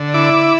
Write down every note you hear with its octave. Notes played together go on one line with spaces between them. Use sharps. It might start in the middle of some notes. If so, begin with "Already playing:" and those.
Already playing: D3
E4 D6